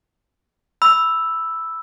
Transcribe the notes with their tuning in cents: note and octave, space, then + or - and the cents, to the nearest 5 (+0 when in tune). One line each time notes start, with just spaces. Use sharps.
B5 +0 E6 +0